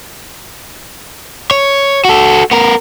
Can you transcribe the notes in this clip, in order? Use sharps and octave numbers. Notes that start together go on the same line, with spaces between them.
C#5
F#4 A4
B3 A#4